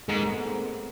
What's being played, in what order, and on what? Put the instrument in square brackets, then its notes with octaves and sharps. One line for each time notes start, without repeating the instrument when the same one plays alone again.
[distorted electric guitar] G#2 [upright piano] G#3 A#3
[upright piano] A3 B3
A#3 C4